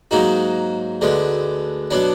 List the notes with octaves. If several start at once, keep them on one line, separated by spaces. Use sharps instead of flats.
G#2 F#3 A#3 D#4 F#4
D2 D3 G#3 B3
B2 F#3 B3 D4